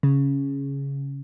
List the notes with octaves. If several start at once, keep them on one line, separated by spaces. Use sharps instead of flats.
C#3